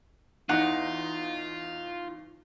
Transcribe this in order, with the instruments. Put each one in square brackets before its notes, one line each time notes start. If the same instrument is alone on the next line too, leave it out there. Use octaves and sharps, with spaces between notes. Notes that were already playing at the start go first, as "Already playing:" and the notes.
[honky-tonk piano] E2 D#4 [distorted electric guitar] F4 [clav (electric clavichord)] F#5